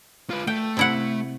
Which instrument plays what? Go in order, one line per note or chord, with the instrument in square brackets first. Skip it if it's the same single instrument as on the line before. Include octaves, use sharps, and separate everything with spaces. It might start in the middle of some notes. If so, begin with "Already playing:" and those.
[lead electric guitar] F4 B4
[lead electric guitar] A3 [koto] G5
[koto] C3 E4 F#5